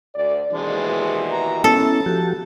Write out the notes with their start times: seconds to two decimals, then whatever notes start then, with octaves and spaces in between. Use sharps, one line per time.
0.15 D2 D5
0.53 D#2 B2 E3 G#3 D4 C5
1.32 A#5
1.64 B3 C#4 E4 A4 A5
2.06 F3 F#4 G4